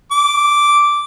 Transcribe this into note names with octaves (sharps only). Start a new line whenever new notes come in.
D6